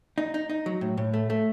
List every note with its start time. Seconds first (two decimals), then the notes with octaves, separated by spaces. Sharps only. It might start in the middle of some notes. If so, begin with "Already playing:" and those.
0.18 D#4
0.34 D#4
0.49 D#4
0.66 F#3
0.81 A2
0.97 A2
1.14 A3
1.30 A3